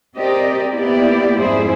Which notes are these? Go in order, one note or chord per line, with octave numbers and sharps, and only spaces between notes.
C4 G4 A#4 D5 D#5
A#3 B3 E4 G4 D5
F2 G#2 G#3 E4 G#4 C5